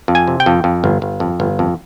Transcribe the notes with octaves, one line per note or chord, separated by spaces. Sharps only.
F2
G#5
C3
G5
F2
F2
G1
G1
F2
G1
F2